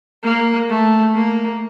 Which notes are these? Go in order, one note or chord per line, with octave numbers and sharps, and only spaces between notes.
A#3
A3
A#3